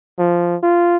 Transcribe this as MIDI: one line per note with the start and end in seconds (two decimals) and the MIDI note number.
0.18 0.56 53
0.63 0.97 65